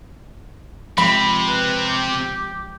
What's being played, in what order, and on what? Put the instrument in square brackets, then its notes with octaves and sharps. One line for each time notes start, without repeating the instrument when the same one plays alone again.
[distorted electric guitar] C3 C4 [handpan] F3 G#3 [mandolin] B5
[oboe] B4
G4